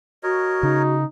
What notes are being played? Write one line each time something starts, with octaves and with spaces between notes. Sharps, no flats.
F#4 A#4 C#5 D#5
C#3 D#4